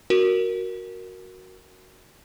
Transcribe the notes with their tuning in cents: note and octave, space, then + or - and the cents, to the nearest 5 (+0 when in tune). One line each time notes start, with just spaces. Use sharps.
F#4 +0 A#4 +0